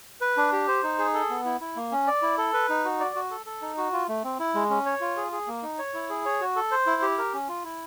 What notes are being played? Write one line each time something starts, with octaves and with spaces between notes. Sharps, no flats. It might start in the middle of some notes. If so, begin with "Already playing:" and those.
B4
D4
G4
C5
D#4
G#4
A4
B3
E4
E4
A#3
C#4
D5
E4
A4
B4
D#4
F#4
D5
F#4
A4
A4
D#4
F#4
F4
A3
C4
E4
G#3
C#4
C#5
F4
G#4
G#4
A#3
D#4
C#5
E4
G#4
C#5
F#4
A4
C5
E4
G4
A#4
C#4
F4
E4